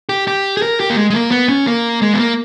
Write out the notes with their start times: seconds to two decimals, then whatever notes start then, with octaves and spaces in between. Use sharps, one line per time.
0.09 G4
0.28 G4
0.57 G#4
0.62 A#4
0.80 G4
0.90 A#3
0.96 G#3
1.10 G#3
1.14 A#3
1.31 B3
1.49 C#4
1.67 A#3
2.02 G#3
2.14 B3
2.19 A#3